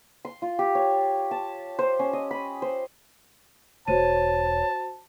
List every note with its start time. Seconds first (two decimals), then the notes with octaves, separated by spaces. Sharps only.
0.25 C6
0.42 F4
0.59 G4
0.75 C#5
1.31 A5
1.79 C5
1.99 C#4
2.13 D#5
2.31 B5
2.62 C5
3.88 E1 F#4 C5 C#5 A5 D#7